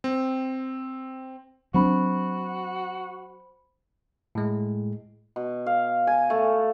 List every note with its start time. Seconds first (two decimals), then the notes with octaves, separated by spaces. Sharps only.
0.04 C4
1.74 F#3 C4 D4 F#4 C5 B5
4.35 A2 G#3
5.36 B2
5.66 F5
6.07 G#5
6.30 A3